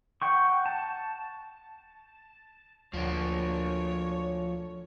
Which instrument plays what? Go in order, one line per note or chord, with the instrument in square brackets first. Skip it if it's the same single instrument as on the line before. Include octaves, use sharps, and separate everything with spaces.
[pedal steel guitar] F#5 G5 C#6
A5
[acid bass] D2 [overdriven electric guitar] F3 D4 [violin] C#5